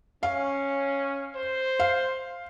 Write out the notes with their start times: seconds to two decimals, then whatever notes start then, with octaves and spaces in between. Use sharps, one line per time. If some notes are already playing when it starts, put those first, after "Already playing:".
0.23 C#4 F5
1.35 C5
1.79 F5